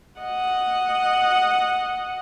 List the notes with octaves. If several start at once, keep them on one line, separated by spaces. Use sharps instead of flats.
D#5 F#5